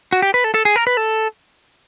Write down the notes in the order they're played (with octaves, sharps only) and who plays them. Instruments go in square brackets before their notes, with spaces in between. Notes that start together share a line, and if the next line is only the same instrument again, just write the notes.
[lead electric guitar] F#4
G4
B4
A4
A4
G#4
A#4
B4
A4